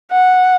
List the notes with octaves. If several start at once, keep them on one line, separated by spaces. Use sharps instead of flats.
F#5